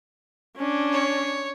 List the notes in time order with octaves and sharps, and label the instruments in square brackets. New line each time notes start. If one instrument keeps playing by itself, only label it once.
[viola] C#4 D4
[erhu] C#5